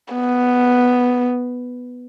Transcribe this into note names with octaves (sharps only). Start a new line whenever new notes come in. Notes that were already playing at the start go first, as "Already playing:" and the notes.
B3